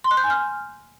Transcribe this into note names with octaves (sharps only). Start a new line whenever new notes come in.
C6
F#6
G6
G#5
F6